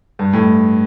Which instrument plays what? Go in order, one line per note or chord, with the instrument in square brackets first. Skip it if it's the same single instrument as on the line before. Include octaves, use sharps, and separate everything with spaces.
[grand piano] G2
A2